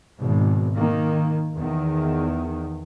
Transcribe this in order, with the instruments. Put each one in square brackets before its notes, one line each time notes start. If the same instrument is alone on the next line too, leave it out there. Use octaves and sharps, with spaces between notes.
[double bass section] G#1 B2
D#3 A#3
E2 D#3